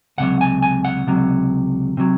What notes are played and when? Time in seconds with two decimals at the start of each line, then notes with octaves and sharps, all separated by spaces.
0.18 C#2 C3 F#3 F#5
0.41 G#5
0.62 G#5
0.85 F#5
1.07 C#2 C3 F#3
1.97 C3 F#3